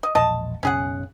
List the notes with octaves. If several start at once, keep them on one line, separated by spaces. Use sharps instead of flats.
D#5
E1 A#1 D#5 A5
F#1 B1 C#3 C#4 G#4 F#5